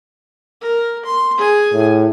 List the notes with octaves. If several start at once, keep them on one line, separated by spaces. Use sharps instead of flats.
A#4
C6
G#4 G#5
A2